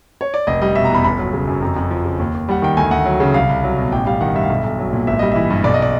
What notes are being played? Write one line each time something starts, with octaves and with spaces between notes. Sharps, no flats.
C#5
D5
F1 D#5
G3 D#5
B2 E5
A#5
E2 B5
G1 B5
F#3
C#3
F#2
F2 A#5
F2
F3
C#3
D#2
D#2
G3 F#5
D#3 G5
D2 G#5
D2 F#5
F#3
C#3
C2 F5
C2
F#3
B2
A1 G5
G3 F5
D#3 F#5
G2 E5
F5
B1 E5
B1
F#3
A#2
G#1 E5
G3 D#5
E3 E5
G2
B1 D5
D#5
D5